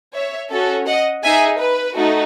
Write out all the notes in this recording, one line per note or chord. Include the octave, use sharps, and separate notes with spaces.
C#5 E5
C#4 F#4 A4
D#5 F#5
D#4 G#4 E5 G#5
B4
A3 D#4 F#4